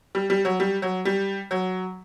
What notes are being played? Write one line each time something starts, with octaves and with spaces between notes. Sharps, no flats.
G3
G3
F#3
G3
F#3
G3
F#3